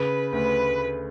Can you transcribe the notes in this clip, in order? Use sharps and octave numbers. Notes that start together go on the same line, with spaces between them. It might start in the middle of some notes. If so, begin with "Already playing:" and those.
Already playing: C#3 B4
D2 B4